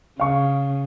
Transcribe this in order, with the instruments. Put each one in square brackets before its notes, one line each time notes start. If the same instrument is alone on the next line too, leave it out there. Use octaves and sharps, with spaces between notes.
[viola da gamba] C#3 [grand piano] F5 C#6